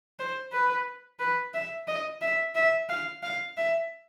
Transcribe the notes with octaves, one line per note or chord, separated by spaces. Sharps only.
C5
B4
B4
E5
D#5
E5
E5
F5
F5
E5